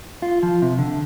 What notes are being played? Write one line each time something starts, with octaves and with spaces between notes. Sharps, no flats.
F4
F3
C3
D3